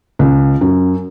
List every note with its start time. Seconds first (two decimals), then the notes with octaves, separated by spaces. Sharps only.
0.19 C#2
0.61 F#2